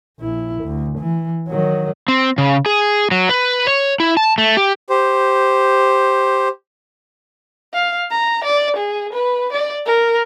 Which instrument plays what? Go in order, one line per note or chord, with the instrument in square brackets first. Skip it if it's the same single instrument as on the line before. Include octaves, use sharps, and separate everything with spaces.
[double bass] A#1 E4
D2
E3
D#3 F#3
[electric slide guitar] C4
C#3
G#4
F#3
B4
C#5
E4
A5
A3
G4
[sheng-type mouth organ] G4 C5
[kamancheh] F5
A#5
D5
G#4
B4
D5
A#4